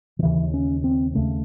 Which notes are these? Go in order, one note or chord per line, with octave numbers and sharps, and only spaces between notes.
D#3
D#2 C#3 E3
C#4
C4
D#2 C#3 A3